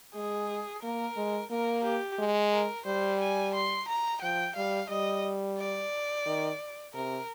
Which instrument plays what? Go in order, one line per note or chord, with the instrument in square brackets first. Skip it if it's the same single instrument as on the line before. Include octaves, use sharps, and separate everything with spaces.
[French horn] G#3 [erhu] G#4
[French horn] A#3 [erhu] A#4
[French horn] G#3
[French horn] A#3 [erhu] A#4
[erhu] G4
[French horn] G#3
[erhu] A#4
[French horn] G3 [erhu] C5
[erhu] G#5
C6
A#5
[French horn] F3 [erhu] G5
[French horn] G3 [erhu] F5
[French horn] G3 [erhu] D#5
[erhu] D5
[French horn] D#3
[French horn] C3 [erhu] A#4